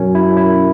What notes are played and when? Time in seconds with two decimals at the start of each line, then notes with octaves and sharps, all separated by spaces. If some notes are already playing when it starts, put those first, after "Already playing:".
Already playing: F#2 B2 C#4
0.15 E4
0.37 E4